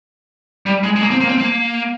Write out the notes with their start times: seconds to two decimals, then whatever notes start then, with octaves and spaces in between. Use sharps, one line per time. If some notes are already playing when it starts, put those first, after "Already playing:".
0.66 G3
0.83 G#3
0.96 G#3
1.02 A#3
1.10 C4
1.20 A#3
1.28 C4
1.38 A#3